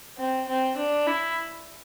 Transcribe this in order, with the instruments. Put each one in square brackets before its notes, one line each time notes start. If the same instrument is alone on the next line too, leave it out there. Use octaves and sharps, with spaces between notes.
[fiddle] C4
C4
D4
E4